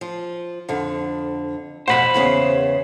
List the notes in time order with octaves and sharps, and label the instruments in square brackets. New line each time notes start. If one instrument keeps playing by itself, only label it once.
[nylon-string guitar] F3
F2 D3
[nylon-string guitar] F2 B2 F#5 [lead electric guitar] C5 B5
[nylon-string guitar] E2 C#3 B3